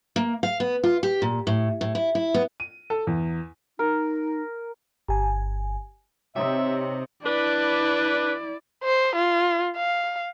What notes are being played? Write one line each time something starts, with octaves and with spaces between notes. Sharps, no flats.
A#3
F5
B3
F4
G4
A#2
A2
A2
E4
E4
B3
D#7
A4
E2
D#4 A#4
G1 G#5
C3 C4 D#4 G4 C#5 E5
D4 E4 B4 D5
C5
F4
F5